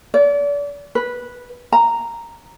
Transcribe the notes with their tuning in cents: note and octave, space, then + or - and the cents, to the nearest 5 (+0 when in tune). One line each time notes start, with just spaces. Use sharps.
D5 -35
B4 -10
A#5 -5